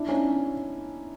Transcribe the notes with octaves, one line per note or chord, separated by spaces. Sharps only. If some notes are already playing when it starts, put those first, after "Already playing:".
Already playing: D4 E4
C#4 D#4